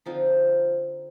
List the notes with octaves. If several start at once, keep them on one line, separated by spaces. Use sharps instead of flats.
D3 F3 C4 D#4 F4